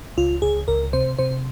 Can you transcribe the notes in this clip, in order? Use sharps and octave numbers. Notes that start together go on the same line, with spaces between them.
C#2 F4
C#2 G#4
C#2 A#4
C3 C5
C3 C5